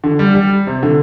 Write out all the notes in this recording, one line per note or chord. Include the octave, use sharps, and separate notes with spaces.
D3
G3
G3
C3
D3